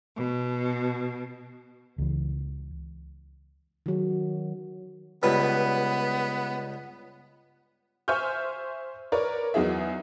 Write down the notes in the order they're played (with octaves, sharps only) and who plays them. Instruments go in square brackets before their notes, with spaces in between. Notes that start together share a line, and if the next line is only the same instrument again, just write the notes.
[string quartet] B2
[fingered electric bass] C#2 E3
[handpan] D#3 F#3
[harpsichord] C#2 G2 B4 [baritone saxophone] B3
[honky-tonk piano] C5 E5 G#5 C#6 F6 G6
A#4 B4 C#5 D5
E2 F#3 D#4 G#4 E5